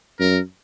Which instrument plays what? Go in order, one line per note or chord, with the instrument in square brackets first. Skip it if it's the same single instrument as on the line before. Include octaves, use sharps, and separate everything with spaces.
[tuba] F#2 [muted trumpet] A#4